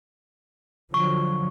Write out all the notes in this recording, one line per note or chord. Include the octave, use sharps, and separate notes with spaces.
D3 F3 F#3 C#6